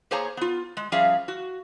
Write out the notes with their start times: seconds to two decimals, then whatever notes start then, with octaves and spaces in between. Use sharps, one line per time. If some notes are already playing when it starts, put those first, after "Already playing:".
0.11 A#3 G#4 C5 C#5 G#5 A#5
0.37 B3 F4
0.77 G#3
0.92 F3 G3 C#4 G#4 E5 F5
1.28 F#4